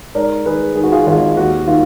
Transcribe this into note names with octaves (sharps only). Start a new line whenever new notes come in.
G#2 A#4 D5
D#3 G#4 B4
D#3 G#4
F#4
F4 G#4
G#1 F4 G#4
D#2 F#4
D#3 F4